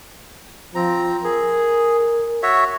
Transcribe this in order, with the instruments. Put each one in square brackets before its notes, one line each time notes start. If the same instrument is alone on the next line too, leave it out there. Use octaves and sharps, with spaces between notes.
[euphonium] F3 [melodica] C4 A#5
[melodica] G#4 [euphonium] A#4
[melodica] F#4 C#5 E5